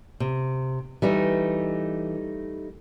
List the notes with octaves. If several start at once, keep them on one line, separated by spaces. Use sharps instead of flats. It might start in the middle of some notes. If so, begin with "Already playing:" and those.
C3
E3 G3 A3 D#4